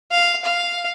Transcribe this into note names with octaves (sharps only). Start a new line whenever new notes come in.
F5
F5